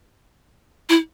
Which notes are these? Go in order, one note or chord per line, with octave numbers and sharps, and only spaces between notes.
E4